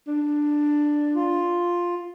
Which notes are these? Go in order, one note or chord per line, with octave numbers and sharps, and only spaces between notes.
D4
F4